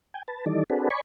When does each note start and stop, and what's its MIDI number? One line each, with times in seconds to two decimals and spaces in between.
0.14 0.23 79
0.14 0.23 80
0.28 0.45 71
0.28 0.45 81
0.46 0.64 51
0.46 0.64 52
0.46 0.64 55
0.46 0.64 63
0.46 0.64 69
0.46 0.64 74
0.70 0.89 60
0.70 0.89 62
0.70 0.89 66
0.70 0.89 68
0.70 0.89 69
0.70 0.89 71
0.90 1.01 73
0.90 1.01 74
0.90 1.01 80
0.90 1.01 83
0.90 1.01 85